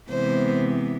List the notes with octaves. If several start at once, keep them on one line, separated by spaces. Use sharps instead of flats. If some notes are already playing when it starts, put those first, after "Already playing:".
C3 E3 G#3 B3 C5